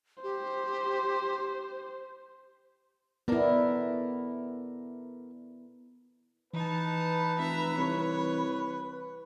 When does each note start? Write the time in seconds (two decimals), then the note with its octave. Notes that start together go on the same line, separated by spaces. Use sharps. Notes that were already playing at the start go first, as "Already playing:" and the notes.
0.23 G4 C5
3.28 B3 E4 A4 A#4 D5
6.54 E3 D#4 B4 A5
7.38 F1 E5 A#5
7.77 C2 C#5